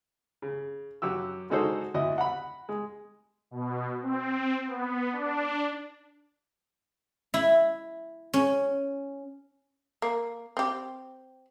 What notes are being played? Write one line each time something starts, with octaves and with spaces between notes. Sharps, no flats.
C#3
F#2 F#4 G4 E6
D3 G#3 D#4 F#4 A4 C5
D2 E4 F#4 D#5
F#5 B5
G#3
B2
C4
B3
D4
E4
C#4
A#3
C4 G4